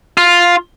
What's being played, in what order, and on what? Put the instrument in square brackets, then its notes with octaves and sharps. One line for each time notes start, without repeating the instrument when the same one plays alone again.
[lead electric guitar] F4